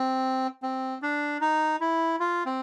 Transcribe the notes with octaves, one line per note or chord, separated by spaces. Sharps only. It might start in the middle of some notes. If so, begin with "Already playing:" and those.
Already playing: C4
C4
D4
D#4
E4
F4
C4